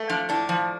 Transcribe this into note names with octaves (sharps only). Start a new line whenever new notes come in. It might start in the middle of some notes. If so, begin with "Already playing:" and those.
Already playing: A3
F3 D4
A2 D4
F3